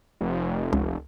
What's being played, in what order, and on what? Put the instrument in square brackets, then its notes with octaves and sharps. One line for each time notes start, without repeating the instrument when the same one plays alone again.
[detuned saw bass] F1
[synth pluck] C#2